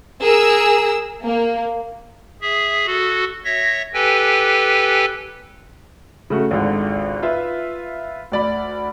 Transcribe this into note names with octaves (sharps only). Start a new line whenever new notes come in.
G#4 A#4 E6
A#3
G#4 E5
F#4 A4
C#5 E5 A#6
G4 A4 B4 G5 G#5
C#3 A3 F#4
G#1 C#2 D3
F4 B4 E5
D2 D5 B5